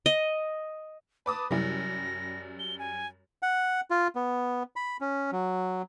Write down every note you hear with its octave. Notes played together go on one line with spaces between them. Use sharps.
D#5
B4 A5 D6 D#6
F#2 C3 F#3 G3 E4 A#6
G7
G#5
F#5
F4
B3
B5
C#4
F#3